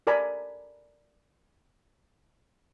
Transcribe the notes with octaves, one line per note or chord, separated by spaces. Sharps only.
A4 A#4 D5 G#5 A#5 B5